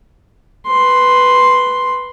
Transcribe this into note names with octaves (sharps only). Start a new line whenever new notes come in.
B4 C6